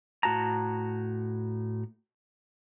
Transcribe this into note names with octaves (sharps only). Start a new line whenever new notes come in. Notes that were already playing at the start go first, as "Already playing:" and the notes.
A2 F#4 A5 A#5